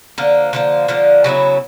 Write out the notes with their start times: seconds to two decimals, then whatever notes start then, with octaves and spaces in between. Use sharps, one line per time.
0.18 D3 F3 A#3
0.53 D3 F3 A#3
0.88 D3 F3 A#3
1.24 C#3 F#3 B3 E4